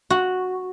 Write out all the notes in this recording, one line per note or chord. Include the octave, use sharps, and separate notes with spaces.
F#4